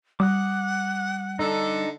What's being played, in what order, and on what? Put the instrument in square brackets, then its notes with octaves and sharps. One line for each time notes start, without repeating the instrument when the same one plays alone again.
[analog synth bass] G3 [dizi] F#5 [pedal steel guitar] D6 D#6 F#6
[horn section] D3 D4 A4 [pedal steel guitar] D#4